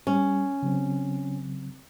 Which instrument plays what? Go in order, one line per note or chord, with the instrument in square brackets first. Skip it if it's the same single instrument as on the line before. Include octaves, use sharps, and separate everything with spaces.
[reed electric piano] G3 [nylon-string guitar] C#4
[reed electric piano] C#3 F#3 C4